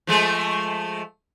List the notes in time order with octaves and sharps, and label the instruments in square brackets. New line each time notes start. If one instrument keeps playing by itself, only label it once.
[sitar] F3 G#3 A3